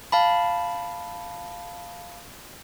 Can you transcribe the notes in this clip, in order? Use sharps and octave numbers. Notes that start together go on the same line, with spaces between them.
F5 A5 B5